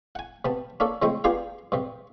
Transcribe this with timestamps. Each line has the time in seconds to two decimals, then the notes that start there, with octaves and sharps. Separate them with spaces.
0.15 F#5 G#5
0.45 C3 B3 A5
0.80 A#3 C#4 D4 A4
1.02 C#3 F3 G#3 A3 C4
1.24 B3 D4 F4 G4 G#4 F5
1.72 G2 C3